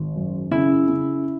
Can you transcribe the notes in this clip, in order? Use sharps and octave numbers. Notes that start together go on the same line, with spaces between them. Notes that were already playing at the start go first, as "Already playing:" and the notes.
Already playing: G#1
F#2
C#3 E4
C#3